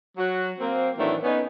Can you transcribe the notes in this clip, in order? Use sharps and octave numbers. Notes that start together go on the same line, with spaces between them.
F#3 F#4
A#3 C4
A2 D#3 E3 F#3 A3 D4
B3 C#4 D#4